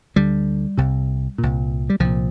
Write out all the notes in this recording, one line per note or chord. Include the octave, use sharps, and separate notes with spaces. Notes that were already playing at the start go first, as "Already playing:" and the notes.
D2 D3 G3
C2 C3
C2 A#2
G3
C2 A#2 F3